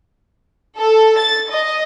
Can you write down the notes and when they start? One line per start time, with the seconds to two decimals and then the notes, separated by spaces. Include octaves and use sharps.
0.78 A4
1.18 A6
1.50 D#5